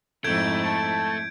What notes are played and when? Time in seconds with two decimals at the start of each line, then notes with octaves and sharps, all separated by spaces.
0.24 F2 G#2 A3 E4 G6 G#6 D7
0.64 A5